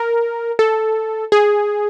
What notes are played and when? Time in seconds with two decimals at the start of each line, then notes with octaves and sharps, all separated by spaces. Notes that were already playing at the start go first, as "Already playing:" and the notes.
Already playing: A#4
0.59 A4
1.32 G#4